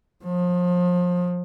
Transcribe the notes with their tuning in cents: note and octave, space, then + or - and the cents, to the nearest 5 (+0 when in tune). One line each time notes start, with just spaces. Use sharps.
F3 +30